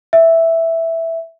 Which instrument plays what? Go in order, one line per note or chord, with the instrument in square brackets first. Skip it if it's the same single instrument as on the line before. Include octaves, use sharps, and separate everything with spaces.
[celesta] E5